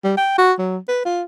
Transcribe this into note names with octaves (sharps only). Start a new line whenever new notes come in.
G3
G5
F#4
F#3
B4
F4